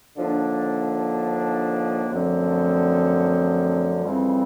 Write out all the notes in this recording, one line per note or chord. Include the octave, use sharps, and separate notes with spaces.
D#2 D3 F3 A#3 D4
F#2 D3 F3 A3 C4
F2 C#3 E3 G3 C4